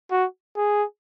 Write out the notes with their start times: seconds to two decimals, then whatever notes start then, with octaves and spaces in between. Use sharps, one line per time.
0.11 F#4
0.57 G#4